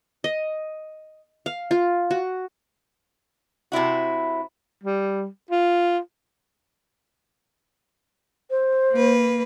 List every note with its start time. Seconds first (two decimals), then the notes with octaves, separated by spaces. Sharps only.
0.24 D#5
1.46 F5
1.71 F4
2.11 F#4
3.72 C3 C4 E4 F#4
4.83 G3
5.51 F4
8.51 C5
8.92 A#3 B4